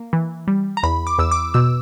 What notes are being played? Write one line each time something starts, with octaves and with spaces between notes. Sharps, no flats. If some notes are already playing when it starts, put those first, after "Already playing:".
Already playing: A#3
E3
G3
A#5
E2 B5
D6
E2 E6
D6
B2 E6